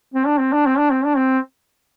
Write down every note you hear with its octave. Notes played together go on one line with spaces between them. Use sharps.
C4
D4
C4
D4
C4
D4
C4
D4
C4